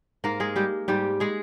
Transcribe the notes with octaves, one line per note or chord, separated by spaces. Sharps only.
G#2 A#3 A#4
G#3 G#4
G3 G#3 G4
G#2 G3 G4
G#3 G#4